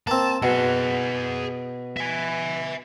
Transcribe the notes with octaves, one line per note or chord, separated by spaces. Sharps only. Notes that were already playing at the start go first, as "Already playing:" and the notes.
A#3 C4 A5
B2 G#4 F#5
E5 G#5